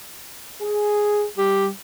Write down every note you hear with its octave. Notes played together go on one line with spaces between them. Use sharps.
G#4
G3 G4